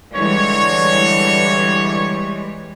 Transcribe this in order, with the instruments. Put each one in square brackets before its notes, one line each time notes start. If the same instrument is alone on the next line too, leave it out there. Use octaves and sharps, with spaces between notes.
[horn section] D3 C#5 [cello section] E3 G3 G#3